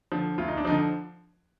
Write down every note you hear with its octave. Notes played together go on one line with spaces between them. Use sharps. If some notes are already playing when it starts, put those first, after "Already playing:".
D3 F3
D2 F4
D#4
D4
D3 F3 D#4